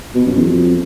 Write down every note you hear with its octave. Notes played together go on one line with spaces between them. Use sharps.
B2
F#2
E2
F2